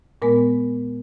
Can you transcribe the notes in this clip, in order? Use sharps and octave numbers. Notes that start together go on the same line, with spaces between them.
A#2 G#3 B3 A#4